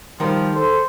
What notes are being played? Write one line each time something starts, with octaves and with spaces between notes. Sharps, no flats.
D#3 F3 G3 A#4
A4 C5